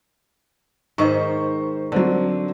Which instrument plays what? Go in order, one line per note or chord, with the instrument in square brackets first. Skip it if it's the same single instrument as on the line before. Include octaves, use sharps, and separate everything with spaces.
[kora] G#2 D#3 E5 [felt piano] C5 C#6
[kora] D3 [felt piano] F#3 C4